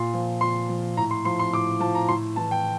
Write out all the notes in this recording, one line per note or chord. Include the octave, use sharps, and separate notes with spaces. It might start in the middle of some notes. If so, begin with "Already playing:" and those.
Already playing: A#2 C6
F3
A#2 C6
F3
A2 A#5
C6
F3 C6
C6
A2 D6
F3 A5
A#5
A2 C6
E3 A5
G5